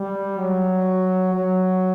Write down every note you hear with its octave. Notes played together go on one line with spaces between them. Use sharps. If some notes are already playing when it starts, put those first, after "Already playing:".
Already playing: G3
F#3
F#3